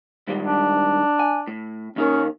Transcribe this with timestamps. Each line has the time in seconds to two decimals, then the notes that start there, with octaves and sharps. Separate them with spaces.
0.28 G#2 D#3 G3
0.45 D4
1.19 G#5
1.47 A2
1.96 D#2 C#4 D#4 A#4